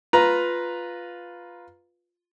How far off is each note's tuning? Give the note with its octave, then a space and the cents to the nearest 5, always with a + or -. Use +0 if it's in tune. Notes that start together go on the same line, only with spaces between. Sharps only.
F4 +5 B4 +0 A#5 +10